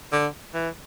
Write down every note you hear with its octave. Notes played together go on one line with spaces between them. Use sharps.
D3
E3